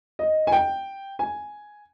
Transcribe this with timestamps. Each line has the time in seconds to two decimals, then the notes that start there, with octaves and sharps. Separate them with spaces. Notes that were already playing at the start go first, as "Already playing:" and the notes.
0.19 D#5
0.47 G#5
0.52 G5
1.19 G#5